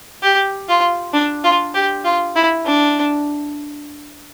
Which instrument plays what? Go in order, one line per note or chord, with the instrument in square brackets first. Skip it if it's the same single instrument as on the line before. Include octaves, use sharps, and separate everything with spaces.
[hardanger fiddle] G4
F4
D4
F4
G4
F4
E4
D4